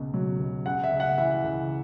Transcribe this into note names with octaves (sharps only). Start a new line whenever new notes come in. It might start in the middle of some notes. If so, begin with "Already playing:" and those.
Already playing: C#2 B2
F#3
C#2
C#3 F#5
E5
C#2
F#5
E3 E5
C#2